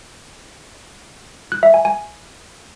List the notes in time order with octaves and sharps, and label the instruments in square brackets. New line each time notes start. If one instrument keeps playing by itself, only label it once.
[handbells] F#6
E5
G#5
G#5